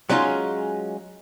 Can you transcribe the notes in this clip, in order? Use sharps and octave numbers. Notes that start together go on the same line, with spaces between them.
F#3 G#3 C#4 D#4 F4